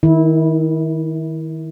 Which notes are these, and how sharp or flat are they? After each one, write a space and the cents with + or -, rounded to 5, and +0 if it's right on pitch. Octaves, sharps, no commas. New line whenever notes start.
D#3 +20 E4 -20